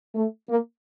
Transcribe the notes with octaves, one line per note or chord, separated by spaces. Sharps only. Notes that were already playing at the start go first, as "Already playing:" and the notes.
A3
A#3